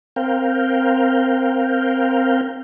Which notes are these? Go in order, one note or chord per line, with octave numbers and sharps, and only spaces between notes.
C4 A#4 F5 G5